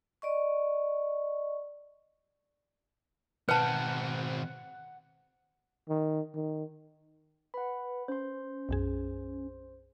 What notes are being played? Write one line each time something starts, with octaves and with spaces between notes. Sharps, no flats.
D5 D#5 C#6
B2 D#3 C4 B4 F#5 A5
D#3
D#3
B4 F#5 B5
C#4 C5 C6
B1 F#2 G#4